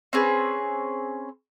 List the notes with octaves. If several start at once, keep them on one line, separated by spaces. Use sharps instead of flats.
C4 C#4 G#4 B4